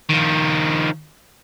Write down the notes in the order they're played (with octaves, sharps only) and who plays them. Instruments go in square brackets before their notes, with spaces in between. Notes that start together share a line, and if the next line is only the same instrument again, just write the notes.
[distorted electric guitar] D#3 F3